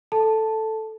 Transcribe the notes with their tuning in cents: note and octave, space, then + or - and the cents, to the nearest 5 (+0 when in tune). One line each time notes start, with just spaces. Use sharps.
A4 +0 A5 +0